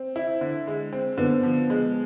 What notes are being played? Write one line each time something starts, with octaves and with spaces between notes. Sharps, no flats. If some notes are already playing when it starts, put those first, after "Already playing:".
Already playing: C4
E4
D3
G#3
C4
D3 B3
F3
G#3